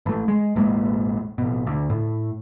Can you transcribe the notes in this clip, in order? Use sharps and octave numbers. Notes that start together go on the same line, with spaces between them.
A1 A3
G#3
E1 A1 G#3 A#3
A1 B2
D2
A2